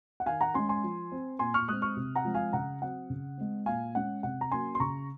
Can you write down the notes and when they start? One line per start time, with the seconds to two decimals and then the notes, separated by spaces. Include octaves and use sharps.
0.20 F#5
0.26 D#3 F5 G#5
0.41 F#5 A#5
0.54 G#3 C#4 G#5 C6
0.69 G#5 C6
0.84 F3
1.12 C4
1.39 A#2 G#5 C6
1.54 C#6 F6
1.68 G#3 C4 D#6 F#6
1.82 C#6 F6
1.96 C3
2.15 F#5 A#5
2.25 F3 G#3 C4
2.34 F5 G#5
2.53 C#3 F#5 A#5
2.82 F#3 C4 F#5
3.10 C#3
3.38 G#3 C4
3.66 A#2 F5 G#5
3.95 G#3 C#4 F#5
4.23 C3 F#5
4.41 A#5
4.51 F#3 A#3 C#4 G#5 C6
4.75 C6
4.80 C#3 A#5 C#6